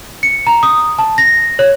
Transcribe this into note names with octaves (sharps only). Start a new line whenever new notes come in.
C#7
A#5
D#6
A5
A#6
C#5